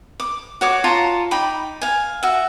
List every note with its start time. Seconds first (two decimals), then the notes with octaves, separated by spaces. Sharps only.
0.20 D6
0.61 F#4 C#5 D6
0.84 F4 C#5 A5 A#5
1.31 D#4 G5 B5 D6
1.81 F5 G#5
2.23 F#4 E5